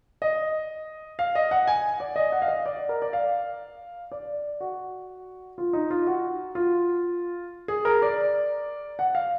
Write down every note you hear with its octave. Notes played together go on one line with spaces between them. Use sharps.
D#5
F5
D#5
F#5
G#5
D5
D#5
F#5
F5
D#5
D5
A#4
D5
F5
D5
F#4
F4
D#4
F4
F#4
F4
G#4
A#4
D5
F#5
F5